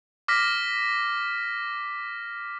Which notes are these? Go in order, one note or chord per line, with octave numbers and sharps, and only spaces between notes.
D6 F6 A#6 B6